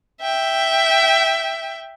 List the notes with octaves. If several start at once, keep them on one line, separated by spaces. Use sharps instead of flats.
E5 G5